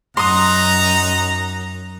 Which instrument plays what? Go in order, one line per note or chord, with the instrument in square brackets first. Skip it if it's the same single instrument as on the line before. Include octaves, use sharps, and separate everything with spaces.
[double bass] F#2 [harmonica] D#4 F#5 [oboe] A#5 [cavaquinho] C6 D#6